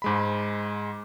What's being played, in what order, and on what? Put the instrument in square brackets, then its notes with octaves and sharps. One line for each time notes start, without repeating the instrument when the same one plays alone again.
[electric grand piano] G#2 G#3 B5